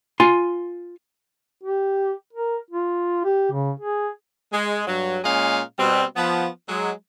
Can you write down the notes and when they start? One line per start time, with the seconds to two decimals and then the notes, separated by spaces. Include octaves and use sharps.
0.20 F4 G#5 C6
1.64 G4
2.33 A#4
2.71 F4
3.24 G4
3.52 C#3
3.80 G#4
4.53 G#3
4.87 G2 F#3
5.24 A#2 G#3 C#4 G#4 D#5 F5
5.79 B2 G3 C4
6.16 F3 B3
6.68 F#3 G#3